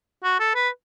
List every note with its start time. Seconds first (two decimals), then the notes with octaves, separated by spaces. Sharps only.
0.24 F#4
0.40 A4
0.55 B4